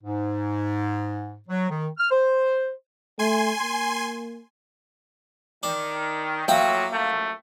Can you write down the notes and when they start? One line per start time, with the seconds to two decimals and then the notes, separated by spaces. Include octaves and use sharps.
0.02 G#2
1.48 F#3
1.69 D#3
1.98 F6
2.11 C5
3.19 A3 G#5 C6
3.62 A#3
5.63 D#3 D4
6.48 A2 F3 F#3 A#3 E5 G5 D#6
6.91 A#1 F#2 A3